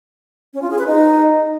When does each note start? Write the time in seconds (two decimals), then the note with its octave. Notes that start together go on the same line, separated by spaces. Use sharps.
0.54 C#4
0.62 F4
0.70 G#4
0.78 B4
0.87 D#4